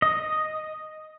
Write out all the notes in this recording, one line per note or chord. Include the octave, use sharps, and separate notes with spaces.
D#5